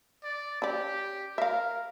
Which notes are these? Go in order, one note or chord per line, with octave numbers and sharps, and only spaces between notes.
D5
C#4 G4 D5
A#4 E5 F5